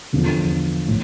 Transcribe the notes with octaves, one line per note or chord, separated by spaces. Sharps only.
E2 D3 F3
A2